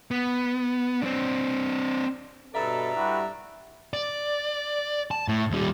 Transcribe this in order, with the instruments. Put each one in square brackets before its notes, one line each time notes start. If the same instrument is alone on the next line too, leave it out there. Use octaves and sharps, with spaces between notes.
[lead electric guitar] B3
C4 D4
[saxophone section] G2 D5 E5 [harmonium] B2 B4 [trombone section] A4 [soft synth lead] A#5
[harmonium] G3 E4 [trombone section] F#4 G4 B4
[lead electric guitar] D5
A5
A2
D#2 G3